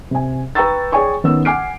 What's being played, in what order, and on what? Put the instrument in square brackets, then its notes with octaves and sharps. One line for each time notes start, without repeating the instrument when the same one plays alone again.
[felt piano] C3 G#5
B4 G5 A#5 C#6 E6 A6
G#4 C#5 D5 G5 G#5 C#6
D#3 B3 C#4 E6
F#5 G#5 D6 F6 C7 D7